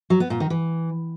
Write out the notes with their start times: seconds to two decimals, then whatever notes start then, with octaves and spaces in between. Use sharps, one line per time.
0.10 F#3
0.20 B3
0.30 A#2
0.40 D#3
0.50 E3